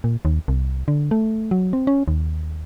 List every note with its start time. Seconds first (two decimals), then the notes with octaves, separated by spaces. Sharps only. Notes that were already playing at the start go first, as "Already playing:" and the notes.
0.04 A#2
0.25 D#2
0.48 C2
0.88 D3
1.11 A3
1.51 F#3
1.73 C4
1.87 C#4
2.08 D#2